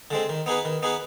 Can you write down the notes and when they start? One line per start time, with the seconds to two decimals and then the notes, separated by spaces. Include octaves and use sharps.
0.11 D3 G#3 C4
0.29 D#3
0.46 B3 D#4 G#4 B4
0.65 D#3
0.83 B3 D#4 G#4 B4